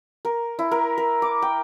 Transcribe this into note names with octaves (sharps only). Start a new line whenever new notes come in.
A#4
E4
A#4
A#4
D6
G5